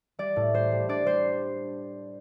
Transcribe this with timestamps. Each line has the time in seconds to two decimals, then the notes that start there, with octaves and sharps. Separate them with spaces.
0.19 G3 D5
0.36 A2
0.54 G3 C5
0.72 G3
0.89 D4 D5
1.06 G3 C5